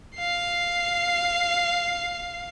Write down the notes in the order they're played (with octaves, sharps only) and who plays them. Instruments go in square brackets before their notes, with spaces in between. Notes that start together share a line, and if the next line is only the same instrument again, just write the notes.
[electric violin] F5 C7